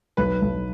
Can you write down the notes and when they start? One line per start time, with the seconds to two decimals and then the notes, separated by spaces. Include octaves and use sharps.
0.17 B1 B4
0.42 B1